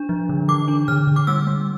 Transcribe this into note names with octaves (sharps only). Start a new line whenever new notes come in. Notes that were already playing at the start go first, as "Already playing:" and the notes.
Already playing: D4
F3
D3
E3 D6
D4
D3 F6
D3
D6
G3 E6
G3